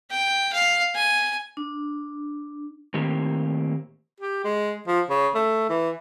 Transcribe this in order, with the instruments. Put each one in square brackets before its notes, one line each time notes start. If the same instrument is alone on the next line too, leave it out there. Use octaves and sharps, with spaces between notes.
[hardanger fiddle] G5
F5
G#5
[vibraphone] D4
[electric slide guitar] A2 D#3 A#3 C4 G4
[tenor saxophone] G4
G#3
F3
C#3
A3
E3